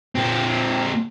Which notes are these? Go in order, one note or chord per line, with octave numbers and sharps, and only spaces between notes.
A#2 C4